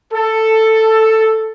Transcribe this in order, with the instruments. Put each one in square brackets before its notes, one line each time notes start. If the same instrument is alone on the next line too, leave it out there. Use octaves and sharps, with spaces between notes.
[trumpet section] A4